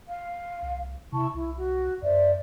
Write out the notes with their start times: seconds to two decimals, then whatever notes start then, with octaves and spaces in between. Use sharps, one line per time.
0.09 F5
0.62 C2
1.12 C3 E4 A5 C#6
1.34 C2 E4
1.57 F#4
2.02 F#2 C5 D5 E5